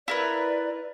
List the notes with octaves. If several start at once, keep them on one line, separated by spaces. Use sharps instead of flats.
E4 A#4 B4 D5